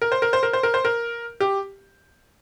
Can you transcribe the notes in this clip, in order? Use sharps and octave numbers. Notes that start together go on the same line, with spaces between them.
A#4
C5
A#4
C5
A#4
C5
A#4
C5
A#4
G4